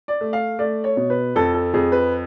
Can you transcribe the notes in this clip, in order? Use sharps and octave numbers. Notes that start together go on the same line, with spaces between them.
D5
A3
F5
A3 D5
C#5
B2
B4
F2 A4
A4
F2 G#4
B4